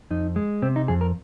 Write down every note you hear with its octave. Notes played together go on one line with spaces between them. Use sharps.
F2 D#4
G#3
C3 C4
D#4
F2 G#4
A#4